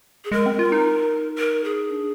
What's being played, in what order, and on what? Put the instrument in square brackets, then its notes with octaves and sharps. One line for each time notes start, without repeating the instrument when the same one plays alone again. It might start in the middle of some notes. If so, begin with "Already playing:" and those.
[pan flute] G#4
[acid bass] G#3 [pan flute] A#4
[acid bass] C4
F4
D#4
[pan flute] A#4
G#4
[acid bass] D4